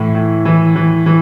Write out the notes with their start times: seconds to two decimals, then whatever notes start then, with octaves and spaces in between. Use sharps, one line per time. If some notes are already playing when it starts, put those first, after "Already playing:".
Already playing: A2 E3
0.15 A2
0.45 E3
0.76 E3
1.06 E3